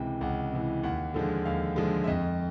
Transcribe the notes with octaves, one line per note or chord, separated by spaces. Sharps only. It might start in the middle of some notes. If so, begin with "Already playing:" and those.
Already playing: C#2 C3 E3 G5
C#2 F#5
C3 E3
D#2 F#5
D3 F3 G#3
D#2 F5
D3 F3 G#3
E5
F2 D#5